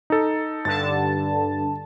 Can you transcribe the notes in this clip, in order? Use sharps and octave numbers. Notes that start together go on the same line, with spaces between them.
D#4 A4
G2 D3 A5 A6